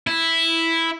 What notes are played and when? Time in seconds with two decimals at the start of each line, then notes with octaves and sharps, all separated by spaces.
0.07 E4